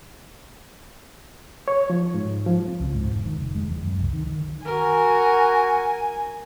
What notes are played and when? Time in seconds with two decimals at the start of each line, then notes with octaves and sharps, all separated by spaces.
1.68 C#5
1.90 F3
2.14 G#2
2.46 F3
2.68 C4
2.80 C#2
2.94 G#2
3.08 E1
3.25 D#3
3.38 F1
3.55 G#3
3.71 E2
3.82 F#2
4.00 C2
4.13 D#3
4.27 D#3
4.66 F#4 A#4 G#5